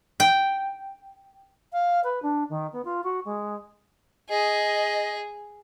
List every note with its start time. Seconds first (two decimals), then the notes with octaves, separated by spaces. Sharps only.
0.20 G5
1.72 F5
2.03 B4
2.22 D4
2.49 D#3
2.72 B3
2.84 F4
3.03 F#4
3.25 G#3
4.29 G#4 D#5